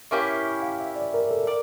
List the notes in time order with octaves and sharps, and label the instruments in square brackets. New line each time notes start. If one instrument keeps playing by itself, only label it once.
[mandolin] A#3 C#4 E4 G4 [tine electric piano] E5
[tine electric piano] F5
E5
D5
A#4
A4
[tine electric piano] A#4 [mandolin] D5